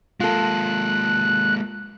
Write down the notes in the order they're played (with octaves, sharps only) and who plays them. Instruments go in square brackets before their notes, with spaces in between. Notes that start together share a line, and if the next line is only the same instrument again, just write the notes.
[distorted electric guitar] G#3 A#3 [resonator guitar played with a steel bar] F4 A4 [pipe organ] F#6